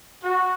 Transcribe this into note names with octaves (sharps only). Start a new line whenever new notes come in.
F#4